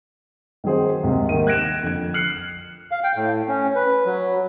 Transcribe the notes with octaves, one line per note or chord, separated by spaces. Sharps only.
D#3 F#3 C4 G#4 C5
D#2 G#2 C3
G#2 D#3 A#3 D#7
F#6 G#6 A#6 D7 E7
F2 D3 G#6
F6 F#6 C7 C#7 F#7
F5
G5
A2
C#4
B4
F#3